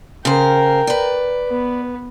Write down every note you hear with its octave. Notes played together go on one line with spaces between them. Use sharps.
C#3 A#4 C5 G5
B4 D5
B3